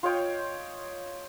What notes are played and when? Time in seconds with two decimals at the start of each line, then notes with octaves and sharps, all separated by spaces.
0.03 F4 C#5 D#5 G5